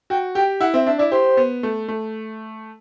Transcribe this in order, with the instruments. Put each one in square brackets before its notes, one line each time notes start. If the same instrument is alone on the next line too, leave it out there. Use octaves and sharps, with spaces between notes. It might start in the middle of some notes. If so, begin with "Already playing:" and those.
[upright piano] F#4 [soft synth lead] G5
[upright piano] G4 [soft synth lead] G5
[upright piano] E4 [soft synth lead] F#5
[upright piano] C4 [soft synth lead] E5
[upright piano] D4 [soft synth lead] E5
[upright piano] E4 [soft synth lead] D5
[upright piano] G4 [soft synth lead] C5
[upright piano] B3
A3
A3